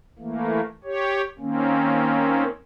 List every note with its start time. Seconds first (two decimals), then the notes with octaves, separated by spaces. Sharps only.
0.19 E3 A3 A#3
0.84 G4 C#5
1.39 D#3 A#3 C4 C#4